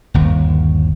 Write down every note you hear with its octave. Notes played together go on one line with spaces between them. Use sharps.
G1 D#2